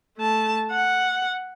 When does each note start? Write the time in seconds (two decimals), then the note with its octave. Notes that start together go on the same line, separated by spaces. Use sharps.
0.18 A3 A5
0.71 F#5